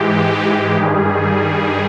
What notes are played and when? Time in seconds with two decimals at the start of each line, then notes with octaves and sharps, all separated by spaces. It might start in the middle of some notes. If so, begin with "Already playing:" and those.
Already playing: G#2 E3 G#3 G4
0.76 G2 D#3 G3 G#4